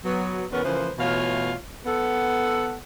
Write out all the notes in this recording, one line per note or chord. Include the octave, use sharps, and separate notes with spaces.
F#3 B3
E2 B3 C#4 A#4 B4
C#3 E3 F3 A#3 B4 C5
B2 E3 A3 F4 C#5 F5
B3 A4 F#5